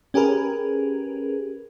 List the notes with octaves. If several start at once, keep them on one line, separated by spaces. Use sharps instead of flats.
C#4 G4 G#4 A#4 B4